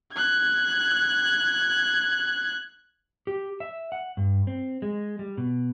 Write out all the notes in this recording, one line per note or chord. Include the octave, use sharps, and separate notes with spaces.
F#6 G#6
G4
E5
F#5
G2
C4
G#3
G3
B2